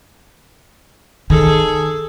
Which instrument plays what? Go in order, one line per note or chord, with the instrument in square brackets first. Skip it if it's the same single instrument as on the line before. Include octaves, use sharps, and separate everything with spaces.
[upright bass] D#3 [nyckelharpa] G#4 A4